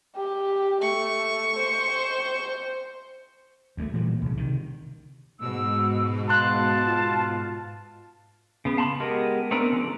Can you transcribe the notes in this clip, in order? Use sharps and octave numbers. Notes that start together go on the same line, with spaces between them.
G4
A3 C#6
C5
D2 G#3 A3
A#2 E3 F3 G3
C2 C#3
C3 D#3
G#2 B2 E6
F5 A5 C6 F#6
F4
C#3 B3
F5 A5 B5 C6
G#3 B3 G4 A#4 D#5
A3 B3 C4 D4 A#4
C#3 F3 D5